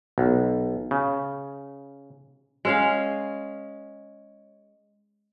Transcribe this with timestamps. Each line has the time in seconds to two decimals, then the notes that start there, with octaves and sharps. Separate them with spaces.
0.18 B1
0.91 C#3
2.65 G#3 C#4 F5